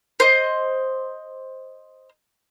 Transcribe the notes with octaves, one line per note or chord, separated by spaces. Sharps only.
C5 D#5